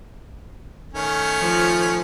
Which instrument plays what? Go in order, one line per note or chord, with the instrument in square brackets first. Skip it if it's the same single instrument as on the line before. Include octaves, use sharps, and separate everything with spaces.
[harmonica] D#3 A3 C#4
[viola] F3